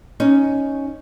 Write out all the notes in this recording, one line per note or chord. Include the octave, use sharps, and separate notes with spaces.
C#4 D#4